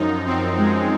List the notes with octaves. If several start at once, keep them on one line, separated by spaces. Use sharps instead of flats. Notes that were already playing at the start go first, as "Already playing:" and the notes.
Already playing: F#2 F3 D#4
C4
G#3